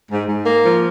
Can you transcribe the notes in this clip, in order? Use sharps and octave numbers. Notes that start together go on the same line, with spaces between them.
G#2
G#2
A#3
F3